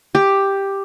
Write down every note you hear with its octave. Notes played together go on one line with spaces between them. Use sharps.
G4